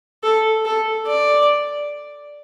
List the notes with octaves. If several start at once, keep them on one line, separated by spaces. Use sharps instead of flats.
A4
A4
D5